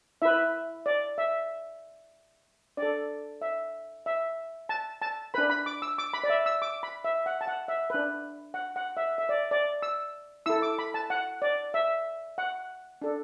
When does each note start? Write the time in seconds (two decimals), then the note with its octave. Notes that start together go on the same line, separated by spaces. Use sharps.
0.22 E4 B4 E5
0.86 D5
1.18 E5
2.77 D4 A4 D5
3.42 E5
4.06 E5
4.69 A5
5.02 A5
5.34 D4 B4 B5
5.50 B5
5.66 D6
5.82 E6
5.98 D6
6.13 B5
6.24 D5
6.30 E5
6.46 E6
6.62 D6
6.83 B5
7.04 E5
7.26 F#5
7.41 A5
7.48 F#5
7.68 E5
7.90 D4 B4
8.54 F#5
8.76 F#5
8.97 E5
9.18 E5
9.29 D5
9.51 D5
9.82 E6
10.46 E4 A4 E6
10.62 D6
10.79 B5
10.94 A5
11.10 F#5
11.42 D5
11.74 E5
12.38 F#5
13.02 D4 A4